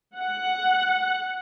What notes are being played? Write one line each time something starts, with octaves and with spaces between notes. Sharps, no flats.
F#5